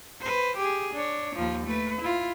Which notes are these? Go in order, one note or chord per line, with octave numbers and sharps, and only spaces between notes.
B4 C5
G4 G#4
D4 C#5
D#2 F3
A3 B4
E4 F4